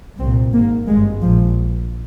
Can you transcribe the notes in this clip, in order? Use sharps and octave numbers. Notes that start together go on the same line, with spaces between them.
C2 A#2 C4
G#1 G#2 A#3
G#1 G2 G#3
A#1 A#2 F3